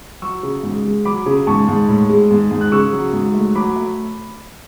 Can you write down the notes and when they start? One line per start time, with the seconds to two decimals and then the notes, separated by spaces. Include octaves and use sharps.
0.22 F#3 C#6 E6
0.43 C#3
0.63 G#2
0.85 G#3
1.05 F#3 B5 D6
1.26 C#3
1.47 G#2 A5 C#6
1.68 G#2
1.89 A2
2.10 G#3
2.31 G#2
2.51 G#2
2.61 F#6
2.72 C#3 C#6 E6
2.93 F#3
3.13 G#2
3.34 A3
3.55 F#3 B5 D6
3.76 A3